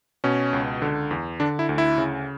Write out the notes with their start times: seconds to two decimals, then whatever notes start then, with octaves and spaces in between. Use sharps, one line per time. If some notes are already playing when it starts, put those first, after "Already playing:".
0.24 B2 C#4
0.53 C#2
0.82 D3
1.11 E2
1.40 D3 D4
1.59 E4
1.69 D2
1.78 E4
1.98 C#3